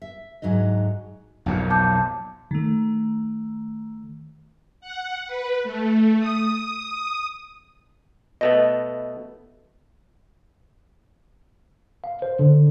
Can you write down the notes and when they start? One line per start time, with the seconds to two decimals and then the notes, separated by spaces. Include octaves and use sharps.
0.02 E5
0.42 D2 G#2 F#3 D#4 D#5
1.46 B1 F2 A#2
1.70 A5 D6 G6
2.51 D#3 A3
4.81 F#5
5.27 B4
5.64 A3
6.20 D#6
8.41 B2 A3 B3 D#5
12.04 F5
12.22 C5
12.39 D3